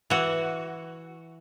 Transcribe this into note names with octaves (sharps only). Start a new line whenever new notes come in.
E3 F#4